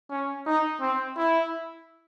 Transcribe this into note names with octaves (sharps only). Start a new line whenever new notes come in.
C#4
D#4
C4
E4